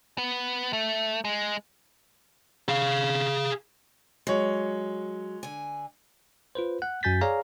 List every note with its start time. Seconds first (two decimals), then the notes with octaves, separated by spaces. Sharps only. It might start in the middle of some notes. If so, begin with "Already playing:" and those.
0.18 B3
0.73 A3
1.25 G#3
2.69 G#4 F5
4.27 F#3 G#3 C#5
5.43 D3 G#5
6.55 F4 B4 C5
6.82 F#5 F#6
7.03 F#2 F#4 G#5 G6 A6 B6
7.21 G#4 C#5 D5 F5 G#5 A#5